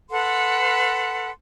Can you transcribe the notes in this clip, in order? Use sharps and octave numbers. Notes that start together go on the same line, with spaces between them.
A4 B4 F#5 C6